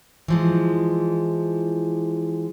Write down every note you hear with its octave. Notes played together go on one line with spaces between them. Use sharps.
E3 F3 G#3